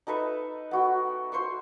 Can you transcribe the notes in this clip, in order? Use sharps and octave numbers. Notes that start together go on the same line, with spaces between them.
D#4 A4 B4 E5
B3 F#4 G5
C5 C6 C#6 E6